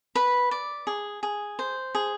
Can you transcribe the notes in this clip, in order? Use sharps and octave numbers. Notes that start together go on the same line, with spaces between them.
B4 B5
D5
G#4
G#4
C5
G#4